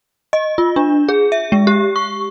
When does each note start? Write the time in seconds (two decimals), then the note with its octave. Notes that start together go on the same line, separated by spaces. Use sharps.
0.33 D#5
0.58 F4
0.76 D4
1.09 G#4
1.32 E5
1.52 G#3
1.67 G4
1.96 C#6